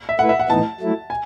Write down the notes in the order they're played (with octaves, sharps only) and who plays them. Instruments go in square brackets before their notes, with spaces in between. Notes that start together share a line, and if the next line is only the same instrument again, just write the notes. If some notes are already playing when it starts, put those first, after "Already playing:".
[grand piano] E5
[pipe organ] A3 E4 B4 [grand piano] F#5
[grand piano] E5
F#5
[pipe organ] A2 E3 B3 D#4 [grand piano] A5
[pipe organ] F#3 A3 E4
[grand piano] G#5